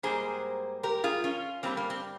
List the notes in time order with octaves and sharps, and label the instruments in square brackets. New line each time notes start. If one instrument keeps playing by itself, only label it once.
[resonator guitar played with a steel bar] G#2 G3 A#3 G#4 C5
G4 A#4
F4 G#4
C#4 F4
G2 G3 A#3 C4
A#3
C4